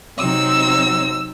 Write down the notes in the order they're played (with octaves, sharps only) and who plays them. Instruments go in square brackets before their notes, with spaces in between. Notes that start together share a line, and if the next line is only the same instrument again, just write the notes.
[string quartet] C3 F#3 C4 D#4 E6